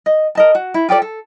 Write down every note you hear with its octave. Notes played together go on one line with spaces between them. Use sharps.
D#5
A#4 D#5 A5
F#4
E4
F4 G4 A4 D5
A4